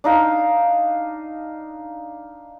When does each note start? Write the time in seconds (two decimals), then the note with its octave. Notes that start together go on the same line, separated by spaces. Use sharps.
0.04 D4 D#4 F5